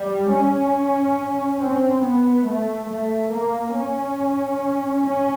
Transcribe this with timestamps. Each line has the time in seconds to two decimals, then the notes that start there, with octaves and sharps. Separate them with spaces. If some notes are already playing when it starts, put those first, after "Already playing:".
Already playing: G3
0.31 C#4
1.60 C4
2.03 B3
2.47 A3
2.89 A3
3.32 A#3
3.76 C#4
5.05 C#4